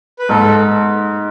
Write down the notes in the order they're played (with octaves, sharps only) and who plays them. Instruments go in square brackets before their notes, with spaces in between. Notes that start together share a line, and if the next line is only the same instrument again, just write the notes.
[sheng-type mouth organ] B4
[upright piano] G#2 [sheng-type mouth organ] A4